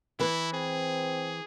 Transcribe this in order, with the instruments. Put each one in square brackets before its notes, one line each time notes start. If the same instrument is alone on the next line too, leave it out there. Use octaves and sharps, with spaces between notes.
[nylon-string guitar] E3 B4 [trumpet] E4
[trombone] C4 [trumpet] G#4